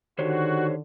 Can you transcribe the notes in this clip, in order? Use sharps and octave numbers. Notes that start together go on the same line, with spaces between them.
D3 D#3 F#4 G4 C5 C#5